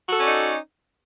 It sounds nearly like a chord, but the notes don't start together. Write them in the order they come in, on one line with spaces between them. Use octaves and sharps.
F#4 A4 C#4 D5 D#4